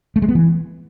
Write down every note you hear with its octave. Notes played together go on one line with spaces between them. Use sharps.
A3
G#3
B3
E3